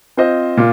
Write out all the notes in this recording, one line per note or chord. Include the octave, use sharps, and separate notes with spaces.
C4 F4 C5 D#5
A#2 F4